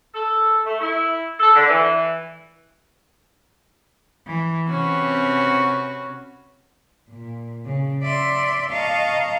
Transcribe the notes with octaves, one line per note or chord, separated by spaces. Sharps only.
A4
A3
E4
A4
D3
E3
E3
C3 C4 C#4 F#4 B4
A#2
C#3
D5 E5 C6
D#5 F5 A5 A#5 C#6